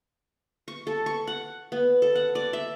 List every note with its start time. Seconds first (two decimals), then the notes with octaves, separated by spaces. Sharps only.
0.68 C#6
0.87 A4
1.06 C#6
1.27 F#5
1.72 B3
2.02 A4
2.15 F#5
2.35 D5
2.53 E5